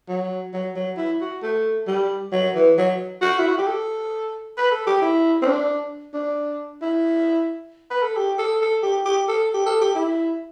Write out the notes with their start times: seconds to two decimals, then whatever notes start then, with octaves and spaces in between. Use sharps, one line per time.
0.08 F#3
0.53 F#3
0.76 F#3
0.97 E4
1.21 F#4
1.42 A3
1.87 G3
2.32 F#3
2.55 E3
2.78 F#3
3.21 F#4
3.39 E4
3.48 F#4
3.58 G4
3.67 A4
4.57 B4
4.71 A4
4.86 G4
5.01 E4
5.42 C4
5.46 D4
6.14 D4
6.82 E4
7.90 B4
8.02 A4
8.16 G4
8.38 A4
8.61 A4
8.83 G4
9.05 G4
9.28 A4
9.54 G4
9.66 A4
9.81 G4
9.95 E4